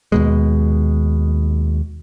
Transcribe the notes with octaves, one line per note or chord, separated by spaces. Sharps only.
D#2 B2 G#3